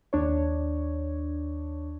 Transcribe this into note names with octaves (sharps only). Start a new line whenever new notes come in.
D#2 D4 C#5